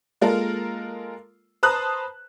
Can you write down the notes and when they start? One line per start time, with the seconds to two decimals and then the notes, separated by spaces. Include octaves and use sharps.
0.21 G#3 A#3 F4 A4 A#4
1.63 B4 C5 A5 A#5 D#6 F#6